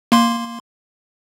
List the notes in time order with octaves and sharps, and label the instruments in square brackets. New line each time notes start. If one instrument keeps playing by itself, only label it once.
[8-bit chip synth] A#3 C6